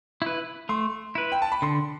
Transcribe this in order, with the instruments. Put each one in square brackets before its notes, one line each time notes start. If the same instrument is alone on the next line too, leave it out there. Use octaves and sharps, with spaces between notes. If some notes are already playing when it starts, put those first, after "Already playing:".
[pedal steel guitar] E4 B4
[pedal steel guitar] A3 [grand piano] C6
[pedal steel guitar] E4 B4
[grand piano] G5
A5
B5
[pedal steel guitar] D3 [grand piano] C6